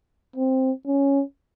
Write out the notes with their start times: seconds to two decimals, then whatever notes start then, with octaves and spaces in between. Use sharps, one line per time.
0.36 C4
0.87 C#4